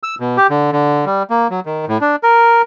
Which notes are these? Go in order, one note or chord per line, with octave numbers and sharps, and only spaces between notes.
E6
B2
G4
D3
D3
G3
A#3
F#3
D#3
A2
D4
A#4